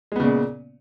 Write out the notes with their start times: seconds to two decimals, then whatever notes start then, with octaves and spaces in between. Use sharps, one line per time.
0.12 G#3
0.16 B3
0.20 C#3
0.24 A#2